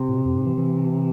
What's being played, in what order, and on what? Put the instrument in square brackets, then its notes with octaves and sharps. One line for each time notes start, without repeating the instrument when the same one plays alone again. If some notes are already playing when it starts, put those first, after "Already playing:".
Already playing: [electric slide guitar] C3
[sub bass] A2
B2
F2
G#2
E3
E3